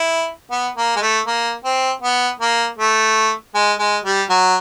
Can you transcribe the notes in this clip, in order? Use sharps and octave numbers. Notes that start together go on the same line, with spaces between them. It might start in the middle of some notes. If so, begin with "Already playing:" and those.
Already playing: E4
B3
A#3
G#3
A3
A#3
C4
B3
A#3
A3
G#3
G#3
G3
F#3